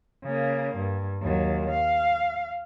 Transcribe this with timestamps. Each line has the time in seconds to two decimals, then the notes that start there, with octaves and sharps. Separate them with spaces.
0.24 C#3 A#3
0.77 G2
1.22 D#2 F#3
1.70 F5